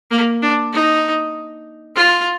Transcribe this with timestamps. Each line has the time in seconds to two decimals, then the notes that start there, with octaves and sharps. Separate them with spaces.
0.11 A#3
0.42 D4
0.73 D#4
1.96 F4